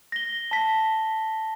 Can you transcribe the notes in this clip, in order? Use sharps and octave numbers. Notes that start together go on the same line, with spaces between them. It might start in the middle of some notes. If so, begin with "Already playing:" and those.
A#6 G7
A5 B6